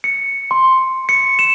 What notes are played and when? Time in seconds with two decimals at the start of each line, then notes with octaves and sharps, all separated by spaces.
0.04 C#7
0.51 C6
1.09 C#7
1.39 E7